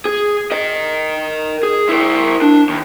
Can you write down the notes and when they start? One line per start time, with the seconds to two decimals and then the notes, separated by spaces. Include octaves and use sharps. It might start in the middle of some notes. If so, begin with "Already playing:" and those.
0.05 G#4
0.51 A#4 D#5
1.63 G#4
1.89 E4 A#4
2.42 D4
2.69 D#2